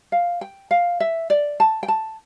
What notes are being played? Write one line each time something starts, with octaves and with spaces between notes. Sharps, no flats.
F5
G5
F5
E5
D5
A5
G5
A5